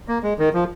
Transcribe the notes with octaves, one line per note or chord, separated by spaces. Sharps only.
A#3
G#3
D#3
F3